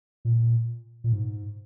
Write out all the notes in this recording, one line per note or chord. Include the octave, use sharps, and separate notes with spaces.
A#2
A#2
G#2